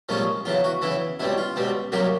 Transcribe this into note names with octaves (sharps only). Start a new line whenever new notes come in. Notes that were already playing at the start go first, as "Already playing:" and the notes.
C2 A#2 F3 G#3 C#4
E2 C#3 E3 F4
F#4
E2 C#3 E3 E4
C#2 B2 G3 C4 E4
F4
C#2 B2 G3 C4
C2 C3 D#3 F#3 A#3 G4